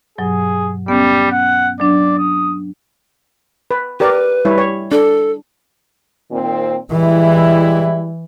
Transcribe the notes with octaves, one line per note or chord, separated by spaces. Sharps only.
G2 B2 F#3 G#4
G3 B3 C#4
F#5
F#3 D4 D5
D#6
B4
G4 A#4 B4 D5
G3 E4 C#5
C#5
D4 A4
A#2 D#3 C4
E3 G3 G#3 E4